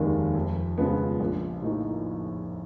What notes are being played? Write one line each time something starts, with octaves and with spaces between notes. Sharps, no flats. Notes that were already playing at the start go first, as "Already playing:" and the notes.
Already playing: F1 D#2 D#3 G#3
F2
C#3 F3 G#3 B3
A#1
A2 F3 A#3 D#4